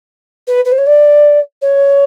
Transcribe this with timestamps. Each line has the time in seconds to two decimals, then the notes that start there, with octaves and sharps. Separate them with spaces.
0.47 B4
0.65 B4
0.72 C5
0.78 C#5
0.86 D5
1.62 C#5